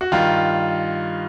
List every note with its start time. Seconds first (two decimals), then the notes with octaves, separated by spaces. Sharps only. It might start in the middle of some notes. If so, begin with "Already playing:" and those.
0.01 F#4
0.12 G2 D#3 F4